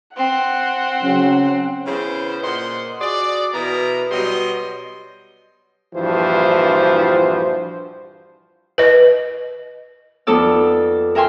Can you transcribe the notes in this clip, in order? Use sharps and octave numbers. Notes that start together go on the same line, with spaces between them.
C4 F#5
C#3 F#3 C#4
C#3 E3 B3 C5
A#2 C5 D#5 F#5 C6
F#4 G#4 D5
B2 E3 B3 A#4 A#5
B2 F#3 G3 D#5 C6
A#1 G2 E3 F3 F#4 C5
B4 D#5
F2 B3 D#4 A4 D5 E6
A#4 E5 G5 G#5 C6